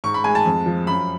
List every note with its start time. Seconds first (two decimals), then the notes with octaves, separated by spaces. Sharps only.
0.04 G#2 C#6
0.14 B5
0.24 G#3 G#5
0.35 A5
0.46 F2
0.66 F3
0.87 F#2 B5